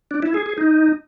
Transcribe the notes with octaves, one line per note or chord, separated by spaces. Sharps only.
D4
E4
G#4
G#4
D#4